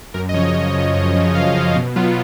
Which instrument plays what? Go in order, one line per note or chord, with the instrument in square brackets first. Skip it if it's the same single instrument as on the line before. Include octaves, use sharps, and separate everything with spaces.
[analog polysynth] F#2 A#4
D#5
C#3 F3 C#5
F#2
C#3 F3
F#2
C#3 F3
F#2 F5
C#3 F3
B2
F#3 B3 F4